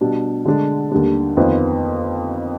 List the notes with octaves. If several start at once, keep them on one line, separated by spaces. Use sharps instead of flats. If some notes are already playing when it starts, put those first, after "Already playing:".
B2 G3 D4 G4
D3 G#3 D4
D#2 D3 G3 D4
F2 D#3 B3 F4 C5